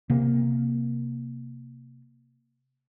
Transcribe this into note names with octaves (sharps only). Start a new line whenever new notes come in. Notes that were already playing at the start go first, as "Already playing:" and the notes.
C3 A#3